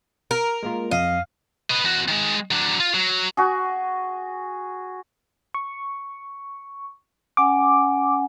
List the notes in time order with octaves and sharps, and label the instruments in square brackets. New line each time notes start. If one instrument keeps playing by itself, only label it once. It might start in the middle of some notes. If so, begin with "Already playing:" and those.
[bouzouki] A#4
[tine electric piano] G#3 A#3 F4
[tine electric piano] F2 [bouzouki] D#5 [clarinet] F5
[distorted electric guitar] B4 D#5
E2 F#4
D#3 G#3
F#3 D4
F4
F#3
[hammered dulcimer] F#4 G#4
[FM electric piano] C#6
[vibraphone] C#4 F#5 G#5 [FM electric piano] D6